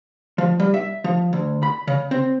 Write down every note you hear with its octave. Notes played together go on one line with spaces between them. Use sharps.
F3
G3
E5
F3
D2
B5
C#3
C4